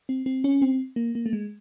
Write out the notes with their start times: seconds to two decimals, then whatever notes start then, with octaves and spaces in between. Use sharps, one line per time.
0.09 C4
0.26 C4
0.44 C#4
0.62 C4
0.96 A#3
1.15 A#3
1.26 A3
1.33 G#3